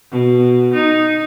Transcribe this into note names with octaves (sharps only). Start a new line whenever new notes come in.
B2
D#4